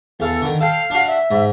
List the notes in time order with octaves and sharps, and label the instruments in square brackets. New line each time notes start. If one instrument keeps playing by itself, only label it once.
[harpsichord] E2 F5 [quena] A4
[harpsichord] D3 D#3
[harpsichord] A4 G5 [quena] F5
[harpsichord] D4 F#4
[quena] E5
[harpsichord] G#2